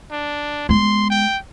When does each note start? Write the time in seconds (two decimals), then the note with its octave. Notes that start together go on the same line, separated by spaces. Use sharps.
0.11 D4
0.69 G#3 B3 C6
1.10 G5